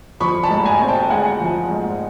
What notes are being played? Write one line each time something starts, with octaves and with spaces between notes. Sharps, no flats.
F3 B5 C#6
A5 B5
G#2
G#5 A#5
C4
G5 A5
G#3 F#5 G#5
F3
G#2